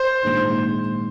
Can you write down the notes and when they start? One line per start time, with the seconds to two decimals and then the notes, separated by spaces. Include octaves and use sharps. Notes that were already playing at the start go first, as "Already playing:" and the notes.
Already playing: C5
0.23 A#1 G#2 D#3